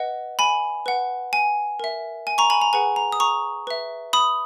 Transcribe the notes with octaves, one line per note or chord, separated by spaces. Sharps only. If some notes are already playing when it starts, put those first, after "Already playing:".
Already playing: B4 D#5 F#5
G#5 B5
B4 F#5
G#5
A#4 E5
G#5
A#5 C#6
G#5 B5
A#5
G#4 B4 F#5 G#5
A#5
D#6
A#5 C#6
B4 E5
B5 D#6